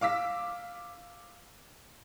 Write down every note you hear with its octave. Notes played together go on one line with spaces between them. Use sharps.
F5 D6 E6 B6